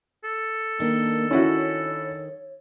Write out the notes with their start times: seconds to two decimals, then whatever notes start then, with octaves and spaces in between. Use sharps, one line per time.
0.24 A4
0.80 D#3 A#3 D4
1.31 C#4 E4 F#4 C#5